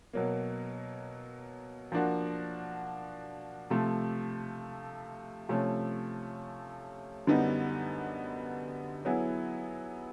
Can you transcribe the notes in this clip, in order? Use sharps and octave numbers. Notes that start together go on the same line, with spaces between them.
B2 F#3 A#3
F3 A#3 D4 F#4
C3 F3 A3
C3 F3 A3 C#4
F#2 D3 G3 B3 D#4
F#3 B3 E4 G#4